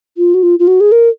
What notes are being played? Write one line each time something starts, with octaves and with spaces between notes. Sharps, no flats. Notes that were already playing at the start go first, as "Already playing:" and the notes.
F4
F#4
F4
F4
F#4
G#4
A#4